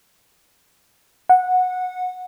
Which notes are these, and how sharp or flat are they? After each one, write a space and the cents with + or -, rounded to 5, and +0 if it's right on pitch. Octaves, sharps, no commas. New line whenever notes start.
F#5 -15